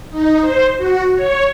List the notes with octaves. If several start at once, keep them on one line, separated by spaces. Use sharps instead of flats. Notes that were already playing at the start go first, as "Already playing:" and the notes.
D#4
C5
F#4
C#5